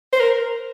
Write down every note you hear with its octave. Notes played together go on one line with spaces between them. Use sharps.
C5
A#4